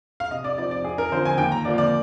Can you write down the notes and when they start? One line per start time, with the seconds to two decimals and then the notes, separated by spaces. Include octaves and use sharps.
0.20 F5
0.31 C3 D#5
0.44 D5
0.58 F3 C4 D#4 D5
0.71 D5
0.84 F2 G#4
0.98 A#4
1.12 D3 F3 C4 C5
1.25 G#5
1.38 D#2 G5
1.52 A#5
1.65 D3 F3 A#3 D5
1.78 D5